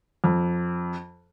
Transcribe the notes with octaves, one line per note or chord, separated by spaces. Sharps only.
F2